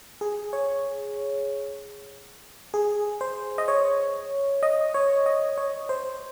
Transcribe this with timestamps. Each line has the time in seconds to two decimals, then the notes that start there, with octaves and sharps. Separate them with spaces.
0.21 G#4
0.53 C#5
2.74 G#4
3.21 C5
3.58 D#5
3.68 C#5
4.63 D#5
4.94 C#5
5.26 D#5
5.58 C#5
5.89 C5